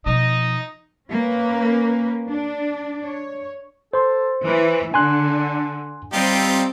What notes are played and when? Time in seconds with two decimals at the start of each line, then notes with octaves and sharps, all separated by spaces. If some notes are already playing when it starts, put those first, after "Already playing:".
0.06 B2 F3 D#4 D#5
1.11 A#3 C#4 B4
2.29 D4
3.08 C#5
3.93 A4 C5 C6
4.46 E3 B4
4.94 D3 D4 G#5 C6 F#6
6.13 G3 C4 D#4 F4 G4